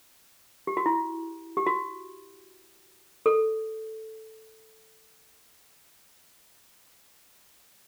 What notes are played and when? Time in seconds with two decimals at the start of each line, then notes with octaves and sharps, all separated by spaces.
0.67 G4
0.77 F#4
0.86 E4
1.57 G4
1.67 F#4
3.26 A4